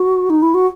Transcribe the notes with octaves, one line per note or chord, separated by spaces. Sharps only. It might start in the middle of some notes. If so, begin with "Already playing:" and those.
Already playing: F#4
D#4
E4
F#4